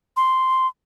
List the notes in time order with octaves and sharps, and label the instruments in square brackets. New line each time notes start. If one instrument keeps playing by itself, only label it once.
[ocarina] C6